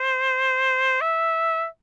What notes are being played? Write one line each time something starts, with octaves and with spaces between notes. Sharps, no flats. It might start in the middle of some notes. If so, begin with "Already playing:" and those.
Already playing: C5
E5